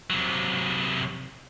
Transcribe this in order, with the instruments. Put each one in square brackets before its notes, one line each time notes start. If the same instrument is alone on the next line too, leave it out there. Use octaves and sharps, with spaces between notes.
[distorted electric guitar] C3 F#3